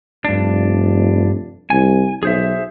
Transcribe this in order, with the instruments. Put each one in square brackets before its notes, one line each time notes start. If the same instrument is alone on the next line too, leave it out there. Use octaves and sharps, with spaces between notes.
[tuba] F1 [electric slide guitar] G2 D4
[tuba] C2 [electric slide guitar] G#5
[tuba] B1 [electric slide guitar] G#4 C5 E5